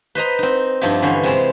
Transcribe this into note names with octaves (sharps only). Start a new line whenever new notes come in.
B4 C5 D#5 A#5
C4 D#4
G2 F3 D#4 E4 G4
D3 E3 C#4 C5
C3 G#3 C4